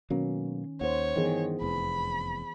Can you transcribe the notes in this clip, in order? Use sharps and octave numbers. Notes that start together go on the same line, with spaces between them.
B2 D#3 F#3 A#3 C#4
D#2 C5 C#5 F#5
G2 D#3 E3 B3 G#4
F1 E2 B5